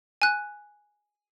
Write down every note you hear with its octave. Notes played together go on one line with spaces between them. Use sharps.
G#5 F#6